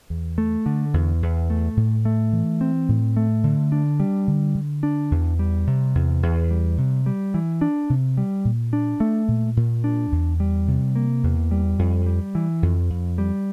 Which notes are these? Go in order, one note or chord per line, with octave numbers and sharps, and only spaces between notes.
E2
A3
D3
E2
E2
A3
A2
A3
E3
C4
A2
A3
D3
D4
G3
D3
D3
D4
E2
G3
C3
E2
E2
G3
C3
G3
E3
D4
C3
G3
A#2
D4
A3
A#2
A#2
D4
E2
G3
C3
A#3
E2
G3
F2
G3
E3
F2
F2
G3